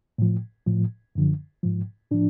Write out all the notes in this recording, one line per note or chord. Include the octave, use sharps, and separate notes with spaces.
A2 F3
A2 F3
F#2 D3 F3
G#2 F3
A2 F3 D4